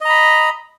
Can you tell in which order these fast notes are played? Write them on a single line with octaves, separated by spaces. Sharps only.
D#5 A#5 B5